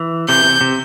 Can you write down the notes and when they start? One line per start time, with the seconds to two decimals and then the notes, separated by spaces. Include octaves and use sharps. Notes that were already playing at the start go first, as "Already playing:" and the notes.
Already playing: E3
0.29 C3 E3 G6
0.45 C3
0.61 C3